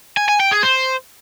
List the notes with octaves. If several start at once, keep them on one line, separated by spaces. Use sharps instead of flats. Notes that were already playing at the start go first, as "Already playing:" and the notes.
G#5
G#5
G5
G#4
C5